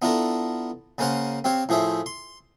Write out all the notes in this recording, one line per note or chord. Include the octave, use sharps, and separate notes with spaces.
B3 D4 E4 F4 A4 A#4
C#3 A#3 C#4 C5 F5 F#5
C4 G4 C#5 F5
A2 F3 G#4 C5 E5
C6